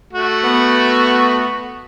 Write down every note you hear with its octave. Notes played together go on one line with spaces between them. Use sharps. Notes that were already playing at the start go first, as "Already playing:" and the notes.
A3 F#4
B3